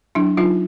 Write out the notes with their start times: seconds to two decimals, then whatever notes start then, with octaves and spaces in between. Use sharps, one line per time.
0.15 F#3 D4 E4
0.37 F#3 D#4 F4